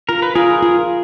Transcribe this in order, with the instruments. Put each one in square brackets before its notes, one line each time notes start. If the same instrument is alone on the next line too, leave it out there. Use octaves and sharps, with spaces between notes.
[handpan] F4 [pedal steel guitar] A#4
[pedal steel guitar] B4
[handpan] F4 [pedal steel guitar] G#4 A#4
[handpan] F4